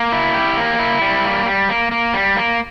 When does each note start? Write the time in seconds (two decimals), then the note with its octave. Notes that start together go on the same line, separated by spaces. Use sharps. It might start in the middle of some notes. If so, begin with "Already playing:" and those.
Already playing: A#3
0.12 E4
0.34 G4
0.57 A#3
0.79 E4
1.02 G3
1.24 A#3
1.46 G3
1.69 A#3
1.91 A#3
2.14 G3
2.36 A#3